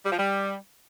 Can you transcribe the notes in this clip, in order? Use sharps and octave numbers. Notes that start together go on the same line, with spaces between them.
G3
F3
G3